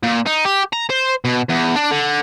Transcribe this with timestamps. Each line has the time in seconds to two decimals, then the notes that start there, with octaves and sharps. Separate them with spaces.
0.03 A#2
0.27 D#4
0.45 G4
0.73 A#5
0.90 C5
1.25 B2
1.49 E2
1.76 D4
1.91 D3